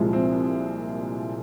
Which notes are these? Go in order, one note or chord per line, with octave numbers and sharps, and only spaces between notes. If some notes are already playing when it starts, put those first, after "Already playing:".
Already playing: C2 A#2 F3 G#3
C4